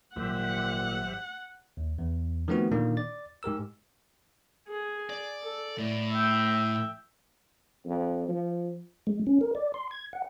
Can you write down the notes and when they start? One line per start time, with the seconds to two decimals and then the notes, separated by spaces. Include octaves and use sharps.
0.16 G#1 A#2 F#3 G3 G4 C5 E5 F#5
1.77 D#2
1.98 E2
2.48 D#3 F3 A3 B3 C4 F#4
2.72 A#2 D3 D#3 A#3 D4
2.97 D5 A6
3.43 G#2 G4 A#4 E6
4.68 G#4
5.10 D5
5.42 A4
5.78 A2 D5
6.12 E5 G5
7.86 F2
8.29 F3
9.07 G#3
9.27 C#4
9.41 A#4
9.55 D5
9.74 C6
9.91 G#6
10.13 F#5